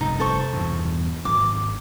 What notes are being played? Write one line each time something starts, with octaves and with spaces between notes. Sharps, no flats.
F1 C2 G2 D#4
A4 C5 C#6
E2 G2 B2
G#1 F#3 D6